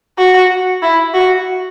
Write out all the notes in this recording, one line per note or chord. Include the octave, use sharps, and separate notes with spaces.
F#4
E4
F#4